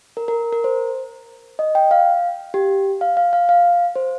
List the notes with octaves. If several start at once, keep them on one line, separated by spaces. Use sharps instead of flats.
A#4
A#4
A#4
C5
D#5
G5
F5
G4
F5
F5
F5
F5
C5